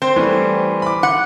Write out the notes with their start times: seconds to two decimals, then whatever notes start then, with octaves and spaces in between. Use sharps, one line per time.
0.02 C4 C5
0.16 E3 G3 A3
0.82 B5 D6
1.03 F#5